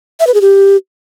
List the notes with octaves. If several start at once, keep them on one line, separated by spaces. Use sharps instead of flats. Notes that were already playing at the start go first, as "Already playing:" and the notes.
E5
B4
G#4
G4